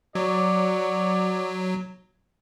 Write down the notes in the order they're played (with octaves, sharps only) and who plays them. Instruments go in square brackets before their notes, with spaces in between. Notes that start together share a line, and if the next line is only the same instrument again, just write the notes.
[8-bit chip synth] F#3 [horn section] F#4 C#5 D5